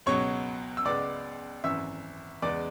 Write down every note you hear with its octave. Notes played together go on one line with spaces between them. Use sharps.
C#2 B2 F#3 C#5 C#6
E6
C#2 C#3 G#3 B3 D5 D6
G#1 F#2 E3 E5 E6
E2 C#3 G#3 B3 D5 D6